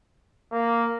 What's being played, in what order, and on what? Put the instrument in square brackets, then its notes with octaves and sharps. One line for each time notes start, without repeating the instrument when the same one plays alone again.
[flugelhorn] A#3